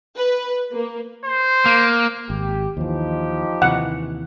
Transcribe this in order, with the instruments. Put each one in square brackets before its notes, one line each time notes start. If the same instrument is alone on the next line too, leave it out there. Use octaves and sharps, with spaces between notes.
[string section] B4
A#3
[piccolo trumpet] C5
[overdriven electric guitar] A#3
[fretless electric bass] G#1 [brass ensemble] G4
[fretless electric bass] D#2 E3 [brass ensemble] F3 D#4 G4
[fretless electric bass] D#2 C3 E3 [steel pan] F#5